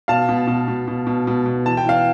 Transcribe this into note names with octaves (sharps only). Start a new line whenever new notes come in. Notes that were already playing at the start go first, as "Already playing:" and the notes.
B2 F5 A5
B2
B2
B2
B2
B2
B2
B2
E3 A5
G5
E3 F5